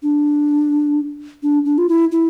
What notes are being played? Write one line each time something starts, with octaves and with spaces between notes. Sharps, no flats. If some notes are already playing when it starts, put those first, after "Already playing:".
D4
D4
D4
F4
E4
E4